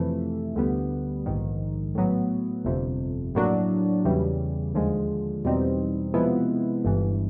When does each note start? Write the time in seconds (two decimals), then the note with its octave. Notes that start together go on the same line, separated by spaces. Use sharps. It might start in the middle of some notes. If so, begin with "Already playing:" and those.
Already playing: F2 C3 E3 A3
0.55 D2 D3 G3 B3
1.26 A#1 G#2 D#3
1.95 A2 F#3 B3
2.65 G1 F2 C3
3.35 A2 F#3 A#3 D4 F#4
4.05 E2 C#3 E3 G3
4.74 D#2 D3 F3 G#3
5.45 E2 B2 G3 C4 D#4
6.14 C3 F3 G#3 B3 E4
6.85 G1 G2 E3